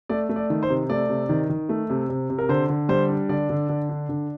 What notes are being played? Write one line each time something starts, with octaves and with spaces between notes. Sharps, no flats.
A3 D5
A3
D5
D#3
C5
C3
A3 D5
C3
D#3
D#3
A3
C3
C3
C3
A#4
D3 C5
D3
G3 C5
D4
D3 D5
D3
D3
D4
D3